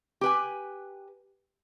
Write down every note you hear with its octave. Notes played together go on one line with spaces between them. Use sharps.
G4 B4 G#5